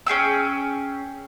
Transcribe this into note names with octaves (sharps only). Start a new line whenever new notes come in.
C#4 G#4 G5 E6